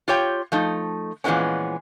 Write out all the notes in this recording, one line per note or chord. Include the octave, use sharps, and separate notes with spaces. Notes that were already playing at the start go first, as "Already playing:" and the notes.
F4 G4 C#5 G5
F3 A3 D#4
A#2 E3 F3 G#3 B3 C#4